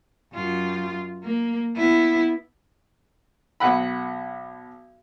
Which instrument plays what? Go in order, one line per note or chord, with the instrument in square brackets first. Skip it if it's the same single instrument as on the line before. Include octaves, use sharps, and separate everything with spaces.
[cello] F#2 F4
A#3
B3 E4
[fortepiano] B1 F#5 B5